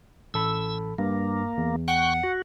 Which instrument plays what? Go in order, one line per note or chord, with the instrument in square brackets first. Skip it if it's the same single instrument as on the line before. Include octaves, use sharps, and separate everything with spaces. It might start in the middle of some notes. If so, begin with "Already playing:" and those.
[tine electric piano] A1 A4 B5 [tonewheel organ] E6
[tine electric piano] G2 [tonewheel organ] A#3
[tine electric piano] E2
[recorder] F#5 [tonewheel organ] G5 C#6 F#6
[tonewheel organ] F#4